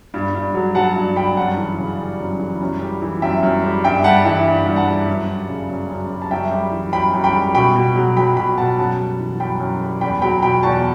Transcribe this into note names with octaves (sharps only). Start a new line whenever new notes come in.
G2
G2
F#3
F#3 F#5 A5
G2
G2 G5 B5
F#2 F#5 A5
E3
C#3
G3
F#2
E3
F#2
G3
E3
F#2 E5 G5
F#2
G3
G2 E5 G5
G3 F#5 A5
E3 E5 G5
G2
G2
F#5 A5
G3
F#2
G3
C#3
F#2
F#2
G3
A5
F#2 E5 G5
G3
E3
F#2 G5 B5
F#2
G5 B5
G3
B2 G5 B5
B2
F#3
F#3 G5 B5
B2 G5 B5
B2 F#5 A5
F#2 F#5 A5
G3
E3
F#2 G5 B5
F#2
G3
E2 G5 B5
F#3 G5 B5
B2 G5 B5
E2 A5 C#6